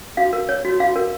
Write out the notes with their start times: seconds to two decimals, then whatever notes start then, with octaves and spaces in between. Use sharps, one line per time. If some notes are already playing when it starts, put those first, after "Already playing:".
0.17 F#4 F5
0.33 A#4
0.49 C#5
0.65 F#4
0.80 F#4 F5
0.96 A#4